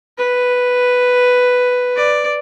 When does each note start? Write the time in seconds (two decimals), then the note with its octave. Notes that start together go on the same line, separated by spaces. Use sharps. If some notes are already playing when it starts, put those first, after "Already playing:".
0.18 B4
1.96 D5